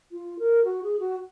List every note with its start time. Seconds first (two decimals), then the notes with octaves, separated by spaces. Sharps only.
0.12 F4
0.39 A#4
0.65 F#4
0.83 G#4
1.00 F#4